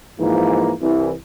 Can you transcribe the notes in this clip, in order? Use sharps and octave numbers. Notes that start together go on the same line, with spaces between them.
G#2 E3 F3 A#3
C2 E3